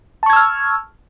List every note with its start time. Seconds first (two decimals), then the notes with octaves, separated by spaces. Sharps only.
0.23 A5
0.26 C#6
0.30 G#6
0.33 E6
0.36 F6